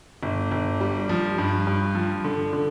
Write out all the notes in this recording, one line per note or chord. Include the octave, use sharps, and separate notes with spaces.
G1
G1
G3
F3
G2
G2
F3
D3
D3